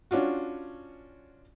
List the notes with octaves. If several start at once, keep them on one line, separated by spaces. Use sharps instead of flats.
C#4 D4 F4 F#4